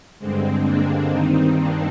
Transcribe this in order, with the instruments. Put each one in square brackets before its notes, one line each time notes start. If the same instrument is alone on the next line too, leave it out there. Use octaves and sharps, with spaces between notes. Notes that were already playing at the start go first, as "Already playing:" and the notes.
[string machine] G2 D3 G#3 C4
A#3 D4
G2 D#3 C4 D#4
A#3 D4